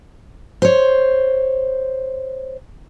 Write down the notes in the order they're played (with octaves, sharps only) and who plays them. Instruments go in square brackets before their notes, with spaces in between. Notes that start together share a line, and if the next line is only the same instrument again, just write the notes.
[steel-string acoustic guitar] C5 C#5